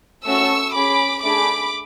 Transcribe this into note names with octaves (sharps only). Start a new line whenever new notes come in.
A3 C#4 F#4 A4 C#6 E6
C#4 G#4 B5 D6
A3 D4 G#4 B5 D6